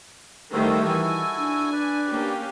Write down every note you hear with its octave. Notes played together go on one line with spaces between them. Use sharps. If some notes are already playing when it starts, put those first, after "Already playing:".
D#3 G3 A3 E4 F#4 A4 C5
E3 G#5
D4
B4 D5
A#3 C#4 G4